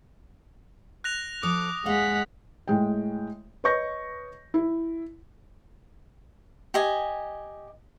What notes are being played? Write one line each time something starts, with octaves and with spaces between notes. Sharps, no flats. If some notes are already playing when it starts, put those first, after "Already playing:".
F#6 A#6 F7
F3 A4 D6 D#6
D#2 G#3 D#5 F5 F#5 B6
A2 G#3 G5
B4 C#5 D#5 C#6 G6 A#6
E4
G4 D#5 G#5